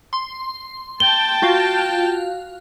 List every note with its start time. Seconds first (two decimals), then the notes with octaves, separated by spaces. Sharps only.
0.13 C6
1.00 G5 A5 G7
1.42 F4 F#4 F5